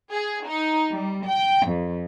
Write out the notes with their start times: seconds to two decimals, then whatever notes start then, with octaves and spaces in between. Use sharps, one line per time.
0.13 G#4
0.47 D#4
0.90 G3
1.27 G5
1.66 F2